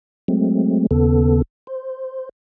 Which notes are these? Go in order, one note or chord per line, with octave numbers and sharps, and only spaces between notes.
F#3 G#3 A3 C4
D#2 C#3 B3 A4
C5